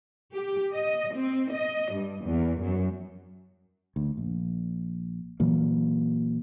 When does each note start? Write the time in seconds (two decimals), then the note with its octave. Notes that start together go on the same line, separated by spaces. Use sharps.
0.33 G4
0.73 D#5
1.15 C4
1.52 D#5
1.93 G2
2.25 E2
2.61 F#2
3.96 D2
4.18 A#1
5.40 A#2 E3 F#3 A#3